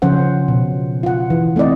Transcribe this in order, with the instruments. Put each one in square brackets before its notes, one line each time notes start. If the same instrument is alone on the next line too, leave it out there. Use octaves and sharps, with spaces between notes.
[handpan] C#3 F3 C#4 C5 F#5
B2
F4 F#5
E3
A3 C4 E4 D5 D#5